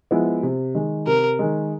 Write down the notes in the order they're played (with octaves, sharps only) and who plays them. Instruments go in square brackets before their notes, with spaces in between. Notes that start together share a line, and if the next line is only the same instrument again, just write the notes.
[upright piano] F3 G#3 B3 E4
C3
D#3 G#3
[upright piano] C3 [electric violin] A#4
[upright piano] D#3 G#3